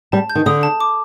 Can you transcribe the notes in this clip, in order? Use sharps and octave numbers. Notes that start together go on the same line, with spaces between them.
G3 A5
G6
D#3
D3 D#6
A5
D6